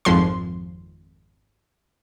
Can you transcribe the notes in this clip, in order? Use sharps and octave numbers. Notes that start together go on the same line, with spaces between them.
G#1 F2 F3 C6